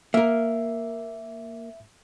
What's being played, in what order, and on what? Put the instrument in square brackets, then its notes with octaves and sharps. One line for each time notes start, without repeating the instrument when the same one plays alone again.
[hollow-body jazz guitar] A#3 A#4 [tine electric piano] E5